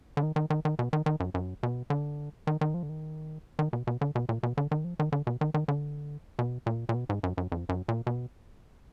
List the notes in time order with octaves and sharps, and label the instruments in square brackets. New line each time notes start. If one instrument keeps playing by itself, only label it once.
[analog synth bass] D3
D#3
D#3
D#3
D#3
B2
D#3
D#3
F#2
F#2
B2
D3
D#3
D#3
F3
D3
D#3
D#3
B2
B2
D3
B2
A#2
B2
D3
D#3
F3
D#3
D3
B2
D#3
D#3
D3
B2
A#2
A#2
B2
G#2
F#2
F#2
F2
F#2
A#2
B2